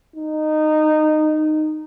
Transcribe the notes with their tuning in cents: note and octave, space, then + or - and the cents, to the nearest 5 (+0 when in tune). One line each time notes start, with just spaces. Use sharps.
D#4 -15